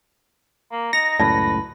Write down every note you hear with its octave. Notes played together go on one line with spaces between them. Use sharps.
A#3
D#4 A#6 C#7 F7
C#2 F#2 A2 B4 D5 A5